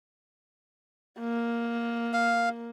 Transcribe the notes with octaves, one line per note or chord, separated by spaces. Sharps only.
A#3
F5